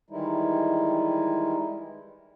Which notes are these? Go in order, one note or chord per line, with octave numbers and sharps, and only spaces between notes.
D#3 E3 G3 G#3 D#4 E4